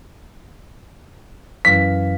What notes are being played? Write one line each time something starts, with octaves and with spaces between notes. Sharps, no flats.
F#2 E3 F5 B6